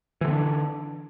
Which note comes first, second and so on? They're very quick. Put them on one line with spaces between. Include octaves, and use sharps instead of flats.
E3 D3 B3 D4